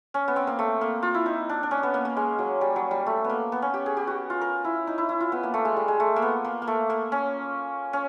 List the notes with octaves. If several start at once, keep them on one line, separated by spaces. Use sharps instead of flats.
C#4
B3
C4
A#3
A3
A#3
F4
E4
D#4
D4
D4
C#4
B3
A#3
A#3
G#3
F#3
G3
F#3
G3
A3
B3
A#3
B3
C#4
G4
G#4
G4
F#4
F4
A#4
E4
D#4
E4
E4
F4
B3
A#3
A3
G#3
G3
G#3
A3
A#3
B3
A#3
A#3
A3
A#3
C#4
C#4